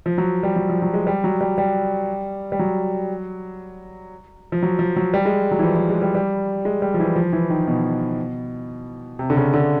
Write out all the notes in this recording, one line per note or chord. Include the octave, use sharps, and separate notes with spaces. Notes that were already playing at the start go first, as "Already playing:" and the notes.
F3
F#3
G3
F#3
F3
F#3
G#3
G3
F#3
G3
G3
G3
F#3
F3
F#3
F3
F#3
G3
G#3
F#3
E3
F3
F3
G#3
G3
G3
G#3
G3
F3
E3
F3
E3
D#3
B2
C3
D3
C#3
D3